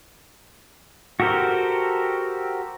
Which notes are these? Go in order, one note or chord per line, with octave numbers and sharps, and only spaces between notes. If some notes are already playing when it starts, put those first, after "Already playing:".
F#4 G4 A4 A#4 C5